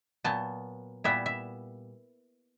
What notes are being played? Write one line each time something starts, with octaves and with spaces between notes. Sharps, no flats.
A#2 F#3 B3 A5
A#2 G3 B3 E4 E5
E5